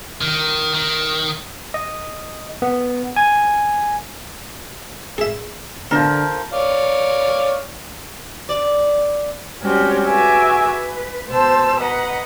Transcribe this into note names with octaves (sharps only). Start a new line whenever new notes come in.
D#3
D#3
D#5
B3
G#5
G#4 E5
D3 F3 B3 D4 A#4
C#5 D5 F5
D5
G3 G#3 C4 C#4 F#4 G4
F#4 G#4 B4 E5 G#5 D6
B4
B2 C5 A5 E6
B4 D#5 F#5 A#5